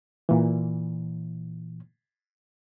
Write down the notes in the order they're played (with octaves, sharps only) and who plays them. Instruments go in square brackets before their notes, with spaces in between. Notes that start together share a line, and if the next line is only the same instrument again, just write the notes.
[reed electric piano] A#2 E3